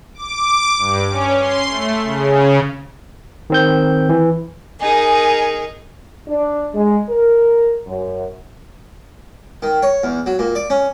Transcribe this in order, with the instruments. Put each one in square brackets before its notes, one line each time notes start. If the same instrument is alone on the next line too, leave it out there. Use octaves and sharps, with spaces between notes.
[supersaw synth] D6
G2
C#4
C6
A3
C#3
[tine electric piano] D#3 C4 G6
E3
[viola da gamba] D#4 G#4 A#4 [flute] G#5
[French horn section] D4
G#3
A#4
F#2
[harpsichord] D#3
C#5
E2
F#3
A#2
D5
C#4